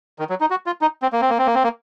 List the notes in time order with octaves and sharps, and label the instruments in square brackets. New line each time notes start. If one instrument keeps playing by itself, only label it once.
[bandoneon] D#3
F#3
D#4
F#4
F4
D#4
C4
A#3
C4
A#3
C4
A#3
C4
A#3